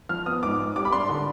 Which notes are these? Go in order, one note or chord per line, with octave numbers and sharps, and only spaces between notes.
F3 F6
B3 D#6
G#2 D6
G#2
G3 D6
B5
D4 C6
D3